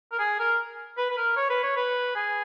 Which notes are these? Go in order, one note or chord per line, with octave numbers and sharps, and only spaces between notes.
A#4
G#4
A#4
B4
B4
A#4
C#5
B4
C#5
B4
G#4